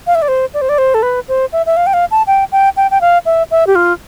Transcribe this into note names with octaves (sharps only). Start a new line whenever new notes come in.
F5
E5
D5
C5
D5
C5
D5
C5
A4
B4
C5
E5
E5
F5
G5
F5
A5
G5
G5
G5
G5
F5
E5
E5
G4
F4